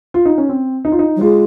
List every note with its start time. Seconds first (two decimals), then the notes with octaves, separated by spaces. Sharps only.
0.14 F4
0.26 D#4
0.38 C#4
0.49 C4
0.85 D#4
0.92 F4
0.99 D#4
1.16 F#3
1.21 G#3 F4